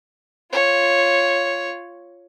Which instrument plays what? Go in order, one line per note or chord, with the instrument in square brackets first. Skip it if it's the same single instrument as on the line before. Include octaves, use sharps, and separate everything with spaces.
[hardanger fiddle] F4 C#5